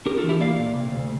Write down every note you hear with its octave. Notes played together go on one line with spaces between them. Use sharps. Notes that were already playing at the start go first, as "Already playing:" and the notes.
D4 G4 A#4
F4 A4
E3
E4 G4
A#3 D5 F5
A#2
C3
D2